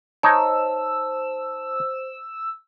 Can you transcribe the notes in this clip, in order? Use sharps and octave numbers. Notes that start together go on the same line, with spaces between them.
D#4 C5 C#5 A5 E6